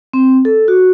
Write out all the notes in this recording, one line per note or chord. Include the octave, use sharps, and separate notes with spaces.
C4
A4
F#4